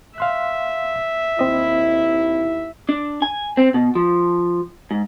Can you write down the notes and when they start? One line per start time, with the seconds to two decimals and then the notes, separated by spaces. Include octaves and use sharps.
0.18 E5 F5 C6 F#6
1.39 D#2 C4 E4 D#5
2.89 D4
3.22 G#5
3.57 C4
3.74 B2
3.95 F3
4.91 G#2